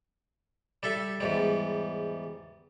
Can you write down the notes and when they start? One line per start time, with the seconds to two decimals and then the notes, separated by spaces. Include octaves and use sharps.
0.83 G3 A4 E5
1.20 E2 G#2 G3